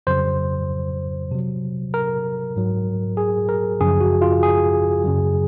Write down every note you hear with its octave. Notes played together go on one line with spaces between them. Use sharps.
F2 C#3 F#3 C5
C3 F#3
A#4
G#2 F#3
G#4
A#4
F#2 C#3 F3 G#4
F#4
F4
G#4
F#2 C#3 F#3